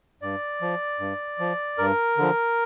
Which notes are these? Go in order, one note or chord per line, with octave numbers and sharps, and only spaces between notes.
G2 D5
F3
G2
F3
G2 A#4
D3 F3